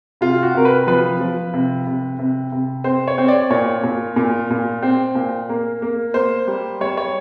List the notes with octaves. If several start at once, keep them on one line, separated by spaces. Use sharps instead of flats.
C3 F4
F#4
C3 A#4
B4
F3 B4
F3
C3
C3
C3
C3
C4 C5
C#5
C4
D5
A#2 C#5
A#2
A#2
A#2
C4
A#2
A#3
A#3
A#3 C5
G3
G3 C#5
C#5